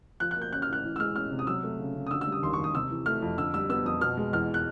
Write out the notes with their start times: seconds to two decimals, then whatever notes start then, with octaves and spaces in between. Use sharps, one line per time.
0.20 F3 F#6
0.31 F#6
0.36 A#3
0.42 G6
0.52 C#4 F#6
0.62 F6
0.68 A2 F#6
0.84 E3
0.96 E6
0.99 G#3 F6
1.15 C#4 F6
1.31 C3
1.39 D#6
1.47 F#3 E6
1.63 A3
1.79 C#3
1.95 C#3
2.07 D#6
2.11 D3 E6
2.21 E6
2.27 G3
2.32 D#6
2.42 D#2 C6
2.53 C#6
2.58 D#2
2.64 D#6
2.74 C3 E6
2.90 E3
3.06 A3 F6
3.22 F2
3.38 D3 E6
3.54 G3 E6
3.69 B3 E6
3.85 F2 D#6
4.01 B2 F6
4.17 G#3
4.33 E2 F6
4.54 F#6